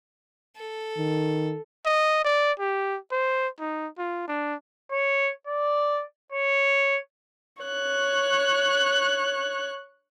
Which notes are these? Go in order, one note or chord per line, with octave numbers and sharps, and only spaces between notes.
A4
D#3
D#5
D5
G4
C5
D#4
F4
D4
C#5
D5
C#5
C#5 F#6